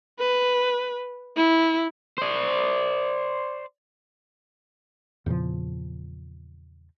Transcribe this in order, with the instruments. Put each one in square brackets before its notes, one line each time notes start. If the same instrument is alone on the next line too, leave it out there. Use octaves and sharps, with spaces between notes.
[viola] B4
E4
[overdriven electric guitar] C5 D5
[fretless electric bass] E2 A#2 C#3 F3